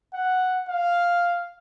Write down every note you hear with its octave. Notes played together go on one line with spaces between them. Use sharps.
F#5
F5